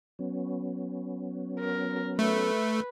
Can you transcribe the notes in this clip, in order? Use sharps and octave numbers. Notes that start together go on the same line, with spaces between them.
F#3 B3 C#4
A#4
A3 B4